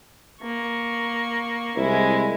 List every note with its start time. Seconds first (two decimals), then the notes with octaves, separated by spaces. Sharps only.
0.42 A#3 C#6
1.77 C2 G#3 E4